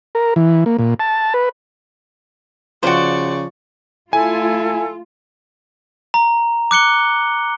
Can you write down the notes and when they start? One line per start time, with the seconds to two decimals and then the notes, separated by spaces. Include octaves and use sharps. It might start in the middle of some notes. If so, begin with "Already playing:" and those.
0.15 A#4
0.36 E3
0.66 A#3
0.79 A#2
1.00 A5
1.34 B4
2.83 C#3 F3 F4 F#4 C5 D5 C#6
4.13 A3 E4 F4 A4 G#5
6.14 A#5
6.71 D6 F#6 C#7 G7